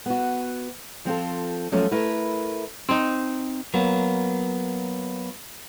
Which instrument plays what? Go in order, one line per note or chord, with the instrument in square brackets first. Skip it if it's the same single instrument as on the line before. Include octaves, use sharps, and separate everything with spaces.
[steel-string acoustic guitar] B3 F#4
F3 C4 F4 A4
F3 F#3 A3 C#4 F4
A3 E4 A#4 B4
[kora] C4 D#4
[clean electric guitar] F#3 A#3 B3